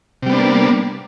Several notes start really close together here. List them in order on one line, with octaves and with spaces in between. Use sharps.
C3 G3 B3 D4 A#3